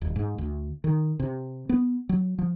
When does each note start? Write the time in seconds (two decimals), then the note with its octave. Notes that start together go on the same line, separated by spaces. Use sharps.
0.02 D#1
0.16 G#2
0.38 D2
0.84 D#3
1.20 C3
1.69 B3
2.09 F#3
2.39 F3